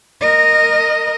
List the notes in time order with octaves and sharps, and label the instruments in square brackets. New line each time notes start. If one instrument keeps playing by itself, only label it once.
[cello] A#4 D#5